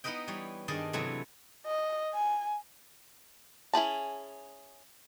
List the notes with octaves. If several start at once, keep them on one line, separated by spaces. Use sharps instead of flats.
B3 D#4 E4 B4 D#5 G5
E3 G3 C#5
G2 D#3 G#4 D5 D#5 A5
C3 E3 F#3 A3 E4 G#5
D#5
G#5
C#4 E4 G#4 A5